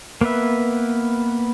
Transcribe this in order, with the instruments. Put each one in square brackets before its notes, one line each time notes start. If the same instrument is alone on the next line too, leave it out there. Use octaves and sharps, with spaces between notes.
[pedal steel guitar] A#3 B3 B4 E5